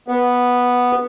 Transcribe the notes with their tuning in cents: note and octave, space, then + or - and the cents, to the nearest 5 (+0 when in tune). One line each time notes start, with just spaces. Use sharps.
B3 -5